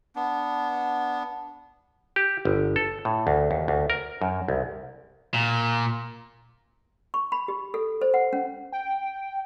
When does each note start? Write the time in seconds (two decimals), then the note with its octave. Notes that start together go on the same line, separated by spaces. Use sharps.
0.16 B3 D4
2.16 G4
2.45 G1
2.76 A4
3.05 A2
3.27 D2
3.51 D#2
3.68 D2
3.90 A#4
4.22 F#2
4.48 C2
5.34 A#2
7.14 C#6
7.32 B5
7.48 G4
7.74 A4
8.01 C5
8.14 F#5
8.33 C#4
8.72 G5